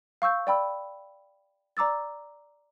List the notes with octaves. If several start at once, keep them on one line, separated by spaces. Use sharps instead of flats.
F5 C#6 E6 G6
D5 G5 B5 E6
D5 A#5 D6 E6 A6